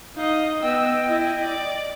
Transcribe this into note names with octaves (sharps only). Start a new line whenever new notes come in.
D#4 D#5 F5
B3 D#5 G5 E6
E4
D5